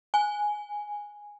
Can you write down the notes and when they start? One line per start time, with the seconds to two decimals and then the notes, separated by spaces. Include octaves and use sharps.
0.14 G#5